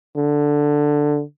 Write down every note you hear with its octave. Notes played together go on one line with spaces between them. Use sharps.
D3